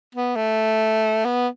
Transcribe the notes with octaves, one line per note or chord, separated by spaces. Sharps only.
B3
A3
B3